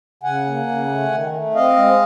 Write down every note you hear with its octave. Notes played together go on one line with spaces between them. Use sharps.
C#3 F#5 G#5
A#3
C#3
A3
D#3
A3
C4 D#5 F5
G#3